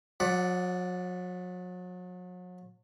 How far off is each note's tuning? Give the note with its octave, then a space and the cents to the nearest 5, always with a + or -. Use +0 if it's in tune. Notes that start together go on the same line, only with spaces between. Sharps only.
F#3 -40 D5 +0 F#5 +0